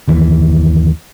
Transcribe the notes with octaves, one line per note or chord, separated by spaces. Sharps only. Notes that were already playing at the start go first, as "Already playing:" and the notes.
G1 D#2 E3